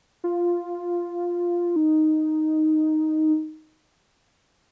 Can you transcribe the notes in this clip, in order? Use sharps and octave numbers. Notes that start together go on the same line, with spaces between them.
F4
D#4